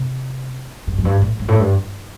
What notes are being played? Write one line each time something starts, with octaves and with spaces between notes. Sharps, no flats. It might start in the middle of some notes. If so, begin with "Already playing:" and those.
Already playing: C3
G2
F#2
G2
A2
G2
A2
G2